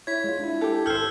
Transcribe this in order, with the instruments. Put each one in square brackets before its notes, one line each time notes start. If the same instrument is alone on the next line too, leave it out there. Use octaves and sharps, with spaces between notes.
[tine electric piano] E4 C#5 [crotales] G#6 B6
[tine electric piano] G#3 F4
D4 E4
[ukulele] G4 A4
[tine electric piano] G#1 G6 [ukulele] A4 C5 [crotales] E6 F6